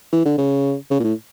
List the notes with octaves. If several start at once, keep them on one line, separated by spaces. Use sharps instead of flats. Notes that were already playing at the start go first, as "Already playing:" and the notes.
E3
D3
C#3
C#3
A#2
A2